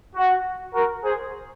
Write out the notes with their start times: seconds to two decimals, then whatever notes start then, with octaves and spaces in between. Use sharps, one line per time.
0.16 F#4
0.74 F#4 A#4
1.03 G#4 C5